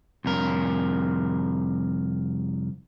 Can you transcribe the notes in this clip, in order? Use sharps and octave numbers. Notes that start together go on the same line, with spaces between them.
C2 F2 A#4